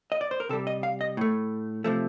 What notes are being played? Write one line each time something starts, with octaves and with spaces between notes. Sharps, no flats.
D#5
D5
C5
A#4
C3 G3 A4
D#5
F5
D#5
A2 A3
C3 F3 A3